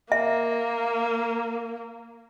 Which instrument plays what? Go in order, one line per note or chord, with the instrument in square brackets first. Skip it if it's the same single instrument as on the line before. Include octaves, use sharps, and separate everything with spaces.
[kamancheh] A#3 [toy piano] E5